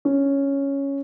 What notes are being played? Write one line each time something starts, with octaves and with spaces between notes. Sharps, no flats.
C#4